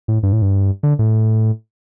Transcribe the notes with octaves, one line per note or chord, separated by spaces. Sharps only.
A2
G2
A2
G2
D3
A2